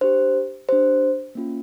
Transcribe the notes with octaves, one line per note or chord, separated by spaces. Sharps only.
D4 G4 C5
D4 G4 C5
A#3 C#4 F4